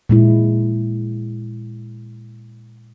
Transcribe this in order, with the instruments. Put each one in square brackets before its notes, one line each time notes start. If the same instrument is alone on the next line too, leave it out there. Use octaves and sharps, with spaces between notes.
[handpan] A#2 G#3 E4